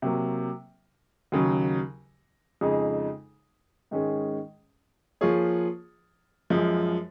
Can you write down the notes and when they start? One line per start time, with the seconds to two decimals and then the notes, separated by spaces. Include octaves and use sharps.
0.02 C3 F#3 A#3
1.32 D#2 C#3 F#3
2.61 F2 C#3 G#3 D#4 G#4
3.91 G#2 D#3 G#3 C#4 G#4
5.21 F3 A#3 F4 G#4 C#5
6.50 F#2 F3 G#3